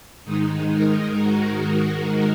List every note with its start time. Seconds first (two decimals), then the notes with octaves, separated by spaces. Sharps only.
0.25 G#2 D#3 G#3 D#4
0.72 A#4
1.20 F#4
1.68 D#4